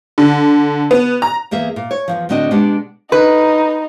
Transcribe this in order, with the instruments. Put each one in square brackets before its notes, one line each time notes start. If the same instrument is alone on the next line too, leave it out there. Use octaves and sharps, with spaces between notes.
[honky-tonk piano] D3
B3
A#5
[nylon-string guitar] E2 A#3 G#4 E5
A#2
C#5
E2 D#3 F3
A2 D3 C4 D4 F#4 D#5
B2 G#3 D4 G4 F#5
[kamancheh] D#4 [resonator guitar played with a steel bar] B4